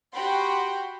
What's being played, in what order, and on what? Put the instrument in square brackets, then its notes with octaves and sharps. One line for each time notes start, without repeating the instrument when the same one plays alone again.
[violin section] F#4 G4 F#5 G5 B5 C6